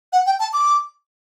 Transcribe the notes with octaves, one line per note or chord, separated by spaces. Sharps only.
F#5
G5
A5
D6